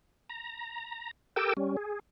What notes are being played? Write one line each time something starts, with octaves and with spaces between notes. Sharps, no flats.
A#5
G4 A4 A#4 G5 D6 E6
G3 C#4
G#4